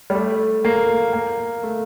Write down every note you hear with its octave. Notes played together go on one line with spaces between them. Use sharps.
G3
A3
A#3
A#3
A3